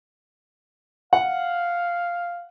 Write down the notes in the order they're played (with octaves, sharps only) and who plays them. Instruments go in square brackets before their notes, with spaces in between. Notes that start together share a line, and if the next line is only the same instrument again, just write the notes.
[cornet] F5 [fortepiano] F#5